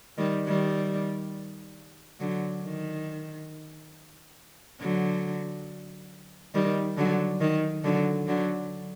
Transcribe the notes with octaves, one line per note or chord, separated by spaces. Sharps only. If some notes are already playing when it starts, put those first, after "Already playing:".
D#3 G3
D#3 G3
D3 F#3
D#3
D3 F#3
D#3 G3
D3 F#3
D#3
D3 F#3
D3 F#3